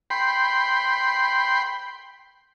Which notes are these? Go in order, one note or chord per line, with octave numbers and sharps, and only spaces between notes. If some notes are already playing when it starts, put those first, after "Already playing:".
G5 B5 C6